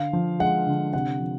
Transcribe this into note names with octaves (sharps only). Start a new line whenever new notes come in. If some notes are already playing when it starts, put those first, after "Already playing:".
Already playing: D3 F5
F3
G#3 F#5
D3
C3 F#5
F3